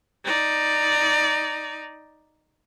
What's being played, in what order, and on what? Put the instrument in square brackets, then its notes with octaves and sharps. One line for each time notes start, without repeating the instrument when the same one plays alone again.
[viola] D#4 D5